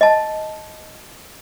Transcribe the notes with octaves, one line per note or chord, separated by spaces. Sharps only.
D#5 A5